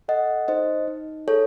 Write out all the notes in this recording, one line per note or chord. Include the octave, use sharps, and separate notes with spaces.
A4 D#5 F#5
D#4 C5 D#5
D#4
G#4 A4 C#5